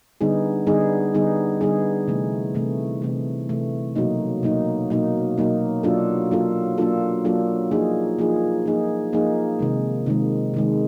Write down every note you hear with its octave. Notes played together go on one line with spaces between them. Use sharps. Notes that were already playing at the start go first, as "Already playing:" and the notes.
D3 G3 B3 D#4 G#4
D3 G3 B3 D#4 G#4
D3 G3 B3 D#4 G#4
D3 G3 B3 D#4 G#4
C3 E3 A3
C3 E3 A3
C3 E3 A3
C3 E3 A3
B2 F#3 A#3 D#4
B2 F#3 A#3 D#4
B2 F#3 A#3 D#4
B2 F#3 A#3 D#4
F#3 A#3 D4 F4 A4
F#3 A#3 D4 F4 A4
F#3 A#3 D4 F4 A4
F#3 A#3 D4 F4 A4
F3 A#3 D#4 G#4
F3 A#3 D#4 G#4
F3 A#3 D#4 G#4
F3 A#3 D#4 G#4
C3 D#3 G#3
C3 D#3 G#3
C3 D#3 G#3